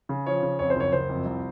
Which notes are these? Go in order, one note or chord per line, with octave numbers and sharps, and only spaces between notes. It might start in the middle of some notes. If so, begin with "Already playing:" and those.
C#3
F3 C#5
C#3
F2 C#5
C5
F#1 C#5
F#1 C5
F2
C2